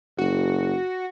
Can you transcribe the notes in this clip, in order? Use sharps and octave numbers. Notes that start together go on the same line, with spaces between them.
F#1 F#4